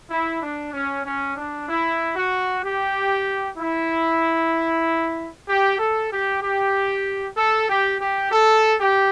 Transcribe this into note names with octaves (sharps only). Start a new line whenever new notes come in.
E4
D4
C#4
C#4
D4
E4
F#4
G4
E4
G4
A4
G4
G4
A4
G4
G4
A4
G4